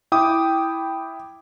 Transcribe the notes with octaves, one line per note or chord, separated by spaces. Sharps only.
E4 G5 D6 D#6